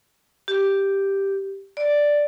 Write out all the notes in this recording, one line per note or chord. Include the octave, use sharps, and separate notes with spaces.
G4
D5